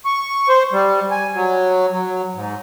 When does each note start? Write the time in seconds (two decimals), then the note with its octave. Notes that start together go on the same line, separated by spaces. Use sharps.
0.05 C#6
0.49 C5
0.72 G3
1.11 G#5
1.35 F#3
1.91 F#3
2.35 G#2